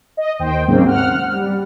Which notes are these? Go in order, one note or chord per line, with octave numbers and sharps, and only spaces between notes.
D#5
D#2 C5 G5
G#2 C#3 F#3 A#3 C4
F#5 F6
G3